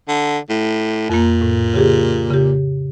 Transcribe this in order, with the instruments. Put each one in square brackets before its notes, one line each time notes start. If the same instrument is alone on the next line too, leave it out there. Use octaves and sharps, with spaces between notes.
[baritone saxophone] D3
A2
[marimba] F2 A#3 [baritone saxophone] A#2
[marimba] A2
C#3 G4 G#4
C#3 G4